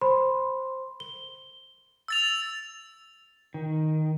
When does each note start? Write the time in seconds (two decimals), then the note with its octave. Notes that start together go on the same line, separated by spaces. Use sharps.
0.01 C5 B5 C6
1.00 G7
2.08 E6 A6 F7
3.54 D#3